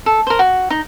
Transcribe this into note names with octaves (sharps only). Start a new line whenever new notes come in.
A4
A#4 C5
F#4
D#4